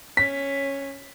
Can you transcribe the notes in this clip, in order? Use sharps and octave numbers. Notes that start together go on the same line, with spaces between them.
C#4 B6